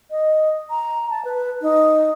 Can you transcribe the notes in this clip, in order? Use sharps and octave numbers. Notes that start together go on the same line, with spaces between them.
D#5
A#5
A5
B4
D#4